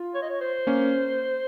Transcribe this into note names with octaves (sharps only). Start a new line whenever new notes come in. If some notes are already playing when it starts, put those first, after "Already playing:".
Already playing: F4
C#5
D#5
C#5
C5
A#3 C#4